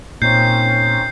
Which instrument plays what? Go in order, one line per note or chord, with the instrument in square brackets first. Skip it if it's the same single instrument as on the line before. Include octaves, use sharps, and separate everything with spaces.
[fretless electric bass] A#2 [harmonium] C4 C#4 D#4 [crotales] G6 C7